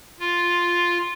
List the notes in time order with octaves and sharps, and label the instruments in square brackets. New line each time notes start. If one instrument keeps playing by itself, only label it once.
[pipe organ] F4